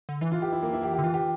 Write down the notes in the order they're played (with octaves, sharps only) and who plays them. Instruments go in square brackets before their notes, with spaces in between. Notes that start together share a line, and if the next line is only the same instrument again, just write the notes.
[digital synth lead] D3
[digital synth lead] E3 [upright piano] E4
[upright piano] F4
G4
E4
A#3
E4
G4
[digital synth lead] D3 [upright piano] G4
[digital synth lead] E3 [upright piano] F4
[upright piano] G4